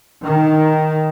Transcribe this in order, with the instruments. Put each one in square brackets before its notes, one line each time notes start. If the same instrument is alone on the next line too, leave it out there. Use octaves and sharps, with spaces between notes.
[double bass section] D#3